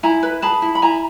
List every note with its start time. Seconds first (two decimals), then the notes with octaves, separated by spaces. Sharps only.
0.03 E4 G#5 A#5
0.23 B4
0.42 G#4 A5 B5
0.62 E4
0.75 B5
0.82 E4 G#5 A#5